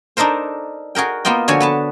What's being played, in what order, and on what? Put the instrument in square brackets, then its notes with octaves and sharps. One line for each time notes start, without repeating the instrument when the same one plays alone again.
[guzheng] D4 D#4 A4 A#4 C5
F#4 G#4 A#4 G5
A#3 B3 F4 D#5 G5
D3 F3 F#4 C#5 G#5
B3 B4 A5